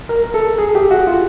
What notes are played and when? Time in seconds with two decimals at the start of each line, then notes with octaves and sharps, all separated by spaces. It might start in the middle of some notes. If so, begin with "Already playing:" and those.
0.09 A#4
0.23 A#4
0.34 A4
0.58 G#4
0.75 G4
0.91 F#4
1.07 F4